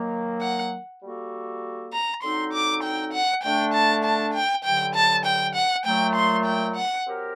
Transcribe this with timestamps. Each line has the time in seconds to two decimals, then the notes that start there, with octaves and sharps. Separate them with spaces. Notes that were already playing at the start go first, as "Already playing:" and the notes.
Already playing: D#3 F#3 A#3
0.41 F#5
1.02 G3 A#3 F#4 A4
1.93 A#5
2.23 D3 F#3 C4 D#4 C6
2.53 D6
2.83 G5
3.13 F#5
3.43 D3 A3 D4 G5
3.74 A5
4.04 A5
4.34 G5
4.64 G2 D3 F#3 G5
4.95 A5
5.25 G5
5.55 F#5
5.85 A#2 F#3 A3 G5
6.15 C6
6.45 G5
6.76 F#5
7.06 F#3 C4 G4 A#4